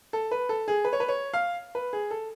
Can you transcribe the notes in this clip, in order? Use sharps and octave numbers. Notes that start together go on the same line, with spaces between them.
A4
B4
A4
G#4
B4
C#5
B4
C#5
F5
B4
G#4
A4